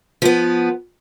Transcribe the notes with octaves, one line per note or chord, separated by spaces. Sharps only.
F3 B3